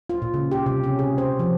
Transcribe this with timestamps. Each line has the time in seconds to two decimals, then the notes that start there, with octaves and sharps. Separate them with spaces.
0.10 F4
0.22 A#2
0.34 C#3
0.51 G4
0.66 C3
0.84 C#4
0.99 G#4
1.18 C5
1.39 F3